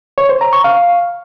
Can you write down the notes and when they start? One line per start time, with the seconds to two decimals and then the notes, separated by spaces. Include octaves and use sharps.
0.18 C#5
0.29 C5
0.41 A#5
0.53 C#6
0.64 F5